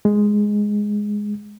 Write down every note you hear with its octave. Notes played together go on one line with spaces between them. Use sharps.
G#3